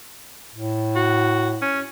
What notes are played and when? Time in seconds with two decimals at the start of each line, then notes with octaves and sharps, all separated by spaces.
0.56 A2
0.95 F#4
1.62 C#4